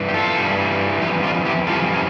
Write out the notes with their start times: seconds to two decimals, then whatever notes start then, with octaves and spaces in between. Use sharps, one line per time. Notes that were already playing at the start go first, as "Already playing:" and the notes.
Already playing: G2 E3
0.09 G4
0.14 F4 A4
0.36 G2 E3 G3
1.01 F2 E3 G4
1.23 D4 F4
1.45 E4 G4
1.67 F2 E3 G3 F4 A4
1.93 C#4